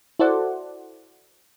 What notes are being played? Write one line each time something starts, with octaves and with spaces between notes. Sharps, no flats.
E4 F#4 A4 C5 D5 F#5